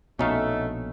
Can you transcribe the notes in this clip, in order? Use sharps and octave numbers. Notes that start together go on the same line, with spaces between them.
A#1 B2 A3 C#4 D#4 F5